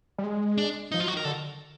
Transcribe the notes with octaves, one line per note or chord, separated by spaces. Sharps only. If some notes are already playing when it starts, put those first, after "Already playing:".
G3
G#3
D4
F3 D#4
F4
F#3
F#4
D#3
A#4
D3 A4